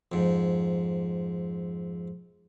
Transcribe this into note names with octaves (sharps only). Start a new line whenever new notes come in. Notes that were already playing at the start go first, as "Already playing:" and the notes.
F2 G#2